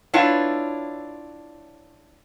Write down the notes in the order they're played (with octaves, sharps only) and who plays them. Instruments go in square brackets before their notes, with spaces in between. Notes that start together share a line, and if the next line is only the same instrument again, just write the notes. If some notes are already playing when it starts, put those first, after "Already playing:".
[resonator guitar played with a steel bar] D4 E4 F4 B4 C#5